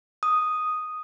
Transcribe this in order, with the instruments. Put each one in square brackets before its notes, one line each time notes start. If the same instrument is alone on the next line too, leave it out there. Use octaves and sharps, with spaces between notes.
[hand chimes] D#6